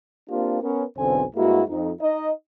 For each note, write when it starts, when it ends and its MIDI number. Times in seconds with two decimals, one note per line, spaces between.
0.29 0.58 58
0.29 0.58 60
0.29 0.58 62
0.29 0.58 65
0.29 0.58 67
0.61 0.83 59
0.61 0.83 61
0.61 0.83 70
0.96 1.23 35
0.96 1.23 40
0.96 1.23 50
0.96 1.23 60
0.96 1.23 72
0.96 1.23 80
1.35 1.62 43
1.35 1.62 56
1.35 1.62 58
1.35 1.62 64
1.35 1.62 66
1.68 1.91 41
1.68 1.91 63
2.00 2.29 63
2.00 2.29 75